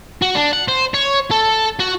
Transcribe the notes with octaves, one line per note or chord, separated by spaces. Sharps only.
F#4
D4
F#5
C5
C#5
A4
F#4